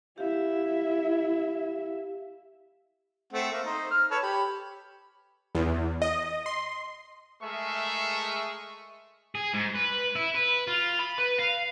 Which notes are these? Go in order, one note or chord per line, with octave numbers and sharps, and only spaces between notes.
E4 G4 E5 F5
A3 C4 F#5
A#3 E5
D#4 C5
F6
A4 B4 C#5
G4 B5
E2
D#5
C6
G#3 A3 G#4 A#4 E5 C#6
G#4
G#2
B4
E4
B4
F4
B5
B4
F5